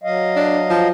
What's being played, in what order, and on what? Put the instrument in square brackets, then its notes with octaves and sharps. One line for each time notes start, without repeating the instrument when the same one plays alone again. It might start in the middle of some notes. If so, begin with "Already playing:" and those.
[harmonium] F#3 D#5 F5
[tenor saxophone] D4
F3